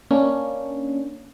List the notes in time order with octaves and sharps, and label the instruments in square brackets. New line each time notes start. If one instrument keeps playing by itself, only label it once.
[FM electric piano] A#3 C#4 D4